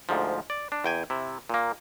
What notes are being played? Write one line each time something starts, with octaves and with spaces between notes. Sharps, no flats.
D2 G#2 F3
D5
D4
E2 G5 G#5
C3 E4
A#2 A#3